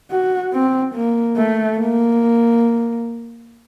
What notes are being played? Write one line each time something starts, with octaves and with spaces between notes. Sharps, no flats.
F#4
C4
A#3
A3
A#3